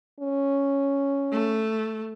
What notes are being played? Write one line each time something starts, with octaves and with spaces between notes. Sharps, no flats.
C#4
A3